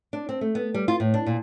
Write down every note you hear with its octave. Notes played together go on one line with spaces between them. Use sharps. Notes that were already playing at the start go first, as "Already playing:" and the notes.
D4
C4
A3
B3
G3
F4
A2
D4
A#2